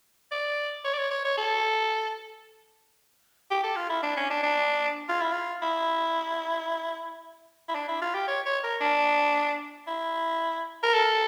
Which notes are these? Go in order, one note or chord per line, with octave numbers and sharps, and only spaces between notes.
D5
C#5
D5
C#5
C#5
C#5
A4
G4
A4
F4
E4
D4
C#4
D4
D4
F4
E4
F4
E4
E4
D4
E4
F4
G4
C#5
C#5
A#4
D4
E4
A#4
A4